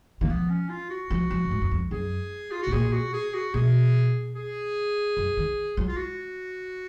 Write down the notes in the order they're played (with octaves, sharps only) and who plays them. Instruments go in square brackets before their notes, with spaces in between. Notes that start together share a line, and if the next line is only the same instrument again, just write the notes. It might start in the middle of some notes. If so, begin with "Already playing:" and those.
[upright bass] D#3 [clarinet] A#3
[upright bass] F3 [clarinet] B3
[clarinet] C#4
F4
F#4
[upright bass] F3
F3
F#2
G#2
F#2
F2
[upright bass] F#2 [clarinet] G#4
[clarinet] F4
[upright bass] B2 [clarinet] F#4
[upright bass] A#2 [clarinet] G#4
[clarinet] F#4
G#4
F#4
[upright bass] B2 [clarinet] G#4
[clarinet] G#4
[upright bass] F#2
D#3
F#3
[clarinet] F4
F#4